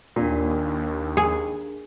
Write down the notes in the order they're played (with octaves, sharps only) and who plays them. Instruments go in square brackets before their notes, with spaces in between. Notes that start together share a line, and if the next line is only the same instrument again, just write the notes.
[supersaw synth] D#2 [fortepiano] A#2 [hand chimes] D4 A#4
[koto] G#4